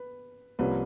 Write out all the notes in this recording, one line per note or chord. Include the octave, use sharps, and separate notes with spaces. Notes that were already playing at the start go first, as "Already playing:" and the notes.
Already playing: B4
C2 C3 F3 A#3 C#4 B4